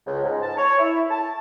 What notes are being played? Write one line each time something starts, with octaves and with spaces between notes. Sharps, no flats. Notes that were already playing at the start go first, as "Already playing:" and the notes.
C#2
G#2
A5
C#5
E4
A5